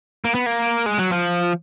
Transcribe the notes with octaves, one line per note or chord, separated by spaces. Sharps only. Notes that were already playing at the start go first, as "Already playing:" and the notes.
A#3
B3
A#3
G#3
F#3
F3